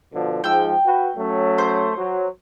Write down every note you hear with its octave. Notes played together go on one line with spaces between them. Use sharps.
B2 D3 F3
G#2 F3 G#3 G5 E6
F#4 B4
F#3 A3 C#4
C5
F#3